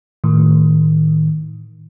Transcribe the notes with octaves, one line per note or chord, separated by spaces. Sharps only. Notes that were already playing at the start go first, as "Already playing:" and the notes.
A2 D#3